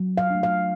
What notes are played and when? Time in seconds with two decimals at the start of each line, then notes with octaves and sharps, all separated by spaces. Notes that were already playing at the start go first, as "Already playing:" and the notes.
Already playing: F#3
0.17 F5
0.30 A3 D4
0.43 F5